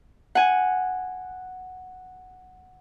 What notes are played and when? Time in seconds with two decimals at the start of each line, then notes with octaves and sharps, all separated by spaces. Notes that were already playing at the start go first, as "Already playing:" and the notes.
0.35 F#5 G#5